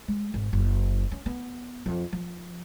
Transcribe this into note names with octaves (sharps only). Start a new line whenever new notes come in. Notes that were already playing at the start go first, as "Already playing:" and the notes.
G#3
G#1
F#1
C#4
B3
F2
F3